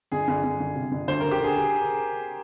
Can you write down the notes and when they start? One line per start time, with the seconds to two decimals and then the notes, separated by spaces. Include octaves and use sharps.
0.12 G1 G#4
0.28 G1
0.43 G1
0.60 G1
0.75 C3
0.92 G1
1.08 D2 C5
1.20 D2 A#4
1.31 G4
1.40 D3 G#4
1.56 G#4